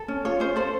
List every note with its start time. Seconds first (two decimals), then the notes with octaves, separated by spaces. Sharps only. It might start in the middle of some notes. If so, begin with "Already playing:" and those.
Already playing: A4
0.08 C#4
0.25 F4 C#5
0.40 C#4 C5
0.56 A4 C5